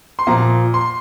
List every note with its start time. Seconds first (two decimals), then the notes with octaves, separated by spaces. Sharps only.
0.19 C6
0.27 A#2 F3 A#5
0.74 C6